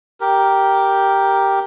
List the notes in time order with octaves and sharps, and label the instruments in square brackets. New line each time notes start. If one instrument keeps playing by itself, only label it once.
[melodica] G4 A#4